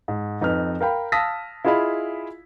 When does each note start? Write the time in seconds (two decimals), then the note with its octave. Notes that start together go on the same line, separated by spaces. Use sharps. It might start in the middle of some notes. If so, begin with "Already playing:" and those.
0.08 G#2
0.41 F2 D#4 B4 F6
0.81 A#4 F5 G5 B5
1.12 F5 A5 D#6 E6 A#6 B6
1.65 E4 F4 G#4 D#5 F5 B5